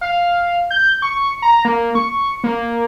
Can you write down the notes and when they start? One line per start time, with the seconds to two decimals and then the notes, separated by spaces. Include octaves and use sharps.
0.01 F5
0.71 G6
1.02 C#6
1.42 A#5
1.65 A#3
1.95 C#6
2.44 A#3